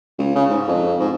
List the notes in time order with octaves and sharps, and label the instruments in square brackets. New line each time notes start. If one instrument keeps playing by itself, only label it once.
[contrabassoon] C#2
C#3
G#2
F2
G#2